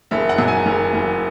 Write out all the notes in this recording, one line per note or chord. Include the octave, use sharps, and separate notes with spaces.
F#1 E5
F#5
F#2
G#5
F#1
F#1